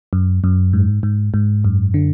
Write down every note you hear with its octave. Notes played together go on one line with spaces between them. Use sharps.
F#2
F#2
G#2
G#2
G#2
F#2
D3